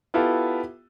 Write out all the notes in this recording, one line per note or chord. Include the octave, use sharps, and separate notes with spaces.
B3 E4 F4 G4 A4